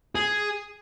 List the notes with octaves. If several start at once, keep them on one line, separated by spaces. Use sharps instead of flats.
G#4